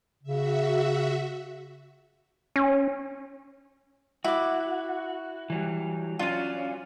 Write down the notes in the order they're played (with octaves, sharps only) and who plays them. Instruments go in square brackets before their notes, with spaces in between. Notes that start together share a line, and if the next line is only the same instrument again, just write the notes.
[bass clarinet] C#3 [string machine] F#4 E5
[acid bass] C#4
[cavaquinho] E4 D6 [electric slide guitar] F#4
[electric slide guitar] E3 F#3 G3
[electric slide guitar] F#3 C#4 D4 [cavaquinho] F4 F5